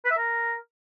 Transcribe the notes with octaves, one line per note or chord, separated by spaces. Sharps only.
B4
E5
A#4